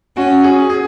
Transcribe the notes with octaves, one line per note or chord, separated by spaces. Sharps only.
C#4 F#4
G#4
G#4